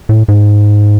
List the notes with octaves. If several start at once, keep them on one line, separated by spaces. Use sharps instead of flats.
A2
G#2